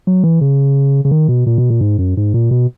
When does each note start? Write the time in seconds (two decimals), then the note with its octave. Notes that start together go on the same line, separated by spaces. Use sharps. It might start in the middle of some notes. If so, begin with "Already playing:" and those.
0.07 F#3
0.24 E3
0.41 C#3
1.05 C#3
1.11 D#3
1.28 B2
1.46 A#2
1.58 B2
1.70 A#2
1.81 G#2
1.98 F#2
2.17 G#2
2.34 A#2
2.51 B2